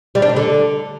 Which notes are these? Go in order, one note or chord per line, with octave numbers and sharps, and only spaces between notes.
G3
D4
G3
D3